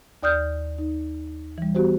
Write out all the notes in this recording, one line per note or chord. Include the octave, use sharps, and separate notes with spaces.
D#2 D5 D#6 F6 G6
D#4
E3 G3
B3 F#4 G4 C5